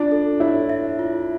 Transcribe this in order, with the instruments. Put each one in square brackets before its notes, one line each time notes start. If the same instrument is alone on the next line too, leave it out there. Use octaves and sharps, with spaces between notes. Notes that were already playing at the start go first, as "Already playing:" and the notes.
Already playing: [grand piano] D4 [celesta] F4
[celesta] A4
[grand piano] E4 [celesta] C#5
[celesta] E5
F4